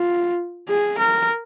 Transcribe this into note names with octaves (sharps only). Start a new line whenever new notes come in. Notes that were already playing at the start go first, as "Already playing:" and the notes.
Already playing: F4
G#4
A#4